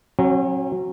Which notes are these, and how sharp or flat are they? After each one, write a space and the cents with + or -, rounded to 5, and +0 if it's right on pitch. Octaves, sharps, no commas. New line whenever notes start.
F#3 +0 C#4 -45